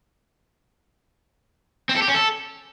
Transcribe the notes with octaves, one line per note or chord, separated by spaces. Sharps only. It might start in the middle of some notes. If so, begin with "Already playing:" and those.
C4
A4
G4
C#4
A4